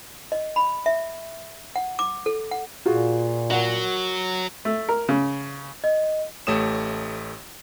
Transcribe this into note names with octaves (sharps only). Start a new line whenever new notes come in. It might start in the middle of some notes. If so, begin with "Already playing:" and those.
D#5
B5
E5
F#5
D6
A4
F#5
A#2 F4 F#4 G#4
F#3 A#4 F#5
A3
A#4
C#3
D#5
A1 A3 G4 C#5 D#6 E7